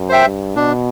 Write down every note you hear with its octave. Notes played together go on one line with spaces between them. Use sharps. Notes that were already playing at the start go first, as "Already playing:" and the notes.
Already playing: F#2
C5 E5 G5
G2
B2 D4